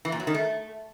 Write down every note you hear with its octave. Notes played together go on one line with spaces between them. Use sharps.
E3
A#2
F#3
D#3
A3